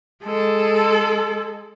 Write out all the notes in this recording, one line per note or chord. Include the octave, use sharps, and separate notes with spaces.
G#3 A4